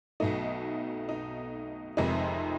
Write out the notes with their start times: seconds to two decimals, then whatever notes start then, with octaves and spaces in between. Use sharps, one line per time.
0.20 B1 B2 F#3 A3 D#4
1.09 D#4
1.97 F1 F2 C3 D#3 G#3 D#4